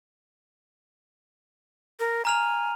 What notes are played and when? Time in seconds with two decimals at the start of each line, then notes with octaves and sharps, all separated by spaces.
2.00 A#4
2.25 G#5 A#5 F6 F7